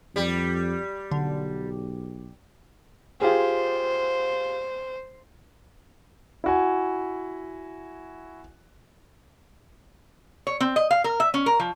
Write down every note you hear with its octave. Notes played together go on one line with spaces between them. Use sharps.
F2 G3
B1 D3
F4 G4 G#4 C5
E4 F#4 G#5
C#5
C4
D#5
F5
A#4
E5
C#4
A#4
F3